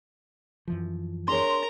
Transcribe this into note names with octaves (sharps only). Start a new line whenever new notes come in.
F#2 E3 F3
D4 G#4 A#4 C#5 A#5 C6